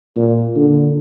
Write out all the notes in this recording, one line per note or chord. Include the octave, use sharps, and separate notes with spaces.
A#2
D3